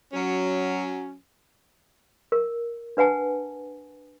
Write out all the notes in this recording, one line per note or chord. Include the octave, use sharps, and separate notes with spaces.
F#3 C#4
A#4
D4 B4 F#5 G#5 A5